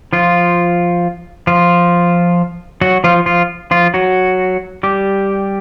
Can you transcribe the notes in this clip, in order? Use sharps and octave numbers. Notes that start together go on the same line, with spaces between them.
F3 F4
F3 F4
F#3 F#4
F3 F4
F3 F4
F3 F4
F#3 F#4
G3 G4